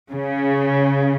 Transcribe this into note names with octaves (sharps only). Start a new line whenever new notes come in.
C#3